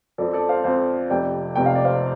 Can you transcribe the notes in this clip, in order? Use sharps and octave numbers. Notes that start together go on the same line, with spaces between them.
F2 F3 C4 A4 D5
A4 D5
C5 F5
F2 F3 C4 C5 F5
F1 F2 C3 D5 G5
F1 F2 C3 G5
F5
D5
C5 F5